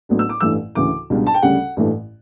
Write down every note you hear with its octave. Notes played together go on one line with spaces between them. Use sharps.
A1 A2 F#3 B3 D4
E6
D6
A1 G2 E3 A3 E6
D2 C#3 E3 D6
C#2 B2 G3 D4
A5
G5
D2 C#3 G3 C#4 F#5
A1 G2 E3 A3